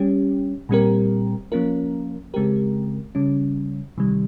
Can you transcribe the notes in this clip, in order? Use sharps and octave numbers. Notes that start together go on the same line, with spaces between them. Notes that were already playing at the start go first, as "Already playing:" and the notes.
Already playing: G3 C#4 G4
A#2 G3 C4 G4 A#4
F3 A#3 C#4 F4 A#4
C#3 G#3 C4 G4 A#4
C#3 G3 C#4
C3 D#3 G3